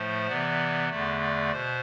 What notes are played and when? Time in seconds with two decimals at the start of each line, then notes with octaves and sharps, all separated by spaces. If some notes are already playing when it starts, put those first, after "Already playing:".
Already playing: A2 F3 A3 C5
0.27 C3 E3 B3 D5
0.89 E2 D3 A3 D5
1.20 D5
1.52 B2 C5